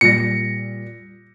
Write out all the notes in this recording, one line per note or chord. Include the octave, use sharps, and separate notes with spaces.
A#2 G3 A#6 C#7